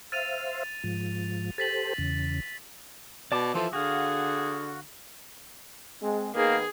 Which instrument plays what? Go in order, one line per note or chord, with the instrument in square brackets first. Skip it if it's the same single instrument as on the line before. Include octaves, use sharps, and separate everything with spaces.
[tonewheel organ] C5 E5 F5 [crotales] A6 D#7 F7
[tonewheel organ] G#2 F3
[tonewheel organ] G4 A4 C5 [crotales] A6 B6 F#7
[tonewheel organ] E2 C#3
[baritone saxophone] B2 [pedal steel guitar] D5 A5 D6
[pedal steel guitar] E3 F4 A4 [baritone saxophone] F3 [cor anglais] E5
[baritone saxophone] D3 [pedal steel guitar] F#4 F5 [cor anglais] G#4
[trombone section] G#3 C4
[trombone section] D#3 B3 [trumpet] A#3 [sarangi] G#4